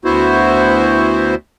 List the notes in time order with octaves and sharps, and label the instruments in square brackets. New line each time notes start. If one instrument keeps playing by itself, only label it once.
[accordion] D2 B3 E4 F#4 C5